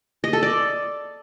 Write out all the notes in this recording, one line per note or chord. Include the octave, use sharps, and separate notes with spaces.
D#5
A4
D5